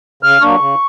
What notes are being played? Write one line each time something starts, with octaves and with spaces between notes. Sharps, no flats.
C#3 F6
F#3 A#3 D4 C#6
C#3